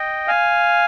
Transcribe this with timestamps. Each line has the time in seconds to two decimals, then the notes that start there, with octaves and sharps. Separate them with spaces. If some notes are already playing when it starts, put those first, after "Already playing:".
Already playing: D#5 G5
0.28 F5 G#5